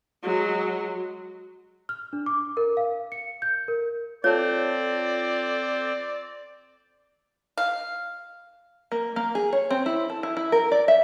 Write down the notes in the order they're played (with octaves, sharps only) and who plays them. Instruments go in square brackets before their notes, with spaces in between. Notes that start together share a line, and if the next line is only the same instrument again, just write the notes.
[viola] F#3 G#3
[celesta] F6
D4
D6
A#4
F5
C#7
G6
A#4
[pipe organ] C4 [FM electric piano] F4 A4 [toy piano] C#5 [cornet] D5
[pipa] F5
[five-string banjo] A#3
A#3
G#4
C#5
C4
E4
A4
E4
E4
A#4
D5
E5